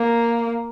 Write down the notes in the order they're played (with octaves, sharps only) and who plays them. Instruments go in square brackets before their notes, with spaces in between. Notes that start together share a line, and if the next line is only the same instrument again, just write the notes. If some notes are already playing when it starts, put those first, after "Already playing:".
Already playing: [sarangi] A#3